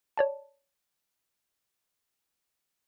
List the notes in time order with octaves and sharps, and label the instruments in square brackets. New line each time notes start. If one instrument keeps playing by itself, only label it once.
[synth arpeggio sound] C#5 D5 A5